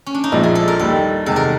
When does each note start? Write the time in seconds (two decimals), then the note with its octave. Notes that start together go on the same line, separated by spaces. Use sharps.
0.06 C#4
0.14 D4
0.24 D#4
0.32 A#1 A#2 F3 G#3 E4
0.43 G#4
0.55 A4
0.68 A#4
0.79 D#2 D#3 G3 A4
1.26 E2 C3 D#3 G#3 A4
1.36 A#4